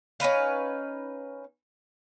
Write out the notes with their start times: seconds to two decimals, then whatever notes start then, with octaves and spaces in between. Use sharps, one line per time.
0.20 C#4 D#4 B4 F5